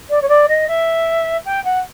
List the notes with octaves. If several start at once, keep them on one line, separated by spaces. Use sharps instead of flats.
D5
C#5
D5
D#5
E5
G5
F#5